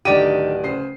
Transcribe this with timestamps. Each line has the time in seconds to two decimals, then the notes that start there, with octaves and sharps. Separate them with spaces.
0.05 D1 D3 D#3 D#4 G4 D5 D#7
0.63 C#3 C5 C7